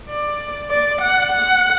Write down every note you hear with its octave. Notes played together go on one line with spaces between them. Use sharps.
D5
D5
F#5
F#5